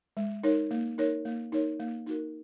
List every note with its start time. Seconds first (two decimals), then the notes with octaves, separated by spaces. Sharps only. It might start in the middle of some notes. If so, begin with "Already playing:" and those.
0.17 G#3
0.44 D#4 A#4 C#5
0.71 A#3
0.98 D#4 A#4 C#5
1.25 A#3
1.52 D#4 A#4 C#5
1.79 A#3
2.06 D#4 F#4 A#4